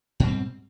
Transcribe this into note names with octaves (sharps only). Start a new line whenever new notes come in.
G#2 B2 G3 C4